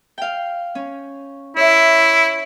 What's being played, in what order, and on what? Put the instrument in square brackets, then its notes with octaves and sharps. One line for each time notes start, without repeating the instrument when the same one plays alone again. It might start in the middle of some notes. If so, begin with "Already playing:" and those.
[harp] F5 G5
C#4
[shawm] E4 [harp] C#5 E5